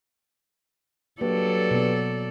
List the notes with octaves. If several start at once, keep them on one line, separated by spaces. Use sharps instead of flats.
G2 F#3 A#3 A4 D5
B2 B3